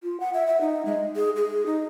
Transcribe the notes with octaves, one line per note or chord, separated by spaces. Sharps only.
F4
F#5
E5
E5
D#4
G#3
G#4
G#4
D#4